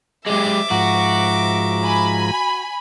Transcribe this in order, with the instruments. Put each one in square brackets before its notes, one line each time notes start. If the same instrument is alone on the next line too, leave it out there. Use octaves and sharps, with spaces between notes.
[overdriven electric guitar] G#3 G4 [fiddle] E5 D6
[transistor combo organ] G#2 F3 A#5 [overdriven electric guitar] F#4
[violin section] G#5 B5